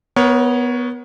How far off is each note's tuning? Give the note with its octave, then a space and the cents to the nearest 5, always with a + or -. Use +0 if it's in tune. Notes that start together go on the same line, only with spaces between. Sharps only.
B3 +0 A#4 +35 C#5 +0